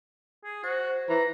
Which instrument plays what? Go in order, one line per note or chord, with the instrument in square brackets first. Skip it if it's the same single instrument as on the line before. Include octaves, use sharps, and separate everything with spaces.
[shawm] G#4
[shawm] F#4 [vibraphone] C5
[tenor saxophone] E3 [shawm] A#5